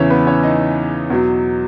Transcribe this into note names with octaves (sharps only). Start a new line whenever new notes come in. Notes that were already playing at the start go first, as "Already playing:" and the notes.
Already playing: E2 C#3 E3 C#4 E4 C#5 E5
B3 B4
C#4 C#5
D#4 D#5
E2 B2 F#3